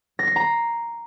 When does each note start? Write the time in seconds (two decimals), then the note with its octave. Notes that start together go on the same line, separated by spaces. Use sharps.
0.19 A#6
0.27 C7
0.36 A#5